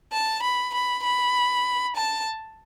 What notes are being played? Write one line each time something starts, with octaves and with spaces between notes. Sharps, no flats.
A5
B5
B5
B5
A5